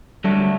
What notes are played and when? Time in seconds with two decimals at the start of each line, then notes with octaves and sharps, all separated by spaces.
0.24 D3 F#3 G3 A3